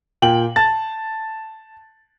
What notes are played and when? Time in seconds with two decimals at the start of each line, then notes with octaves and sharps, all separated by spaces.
0.22 A#2 G5 F#7
0.56 A5 A6